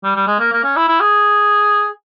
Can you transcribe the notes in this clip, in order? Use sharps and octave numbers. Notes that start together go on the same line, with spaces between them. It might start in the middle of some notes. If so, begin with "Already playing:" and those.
G3
G3
G#3
A#3
A#3
C#4
E4
E4
G#4